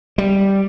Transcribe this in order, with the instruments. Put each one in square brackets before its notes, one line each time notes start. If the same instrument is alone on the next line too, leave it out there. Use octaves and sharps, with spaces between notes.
[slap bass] G3